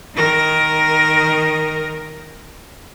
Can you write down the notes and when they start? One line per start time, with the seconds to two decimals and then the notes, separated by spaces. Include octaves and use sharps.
0.15 D#3 A#4